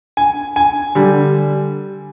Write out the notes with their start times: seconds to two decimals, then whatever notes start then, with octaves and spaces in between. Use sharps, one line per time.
0.17 G#5
0.56 G#5
0.95 D3 G3